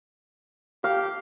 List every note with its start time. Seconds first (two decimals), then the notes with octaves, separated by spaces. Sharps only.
0.84 G4 F5